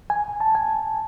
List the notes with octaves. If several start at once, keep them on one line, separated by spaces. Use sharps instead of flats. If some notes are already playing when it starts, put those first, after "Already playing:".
G#5
A5
G#5